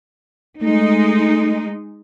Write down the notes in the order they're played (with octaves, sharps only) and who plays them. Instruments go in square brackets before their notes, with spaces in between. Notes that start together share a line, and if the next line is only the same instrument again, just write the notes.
[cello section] G#3 D#4 [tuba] A3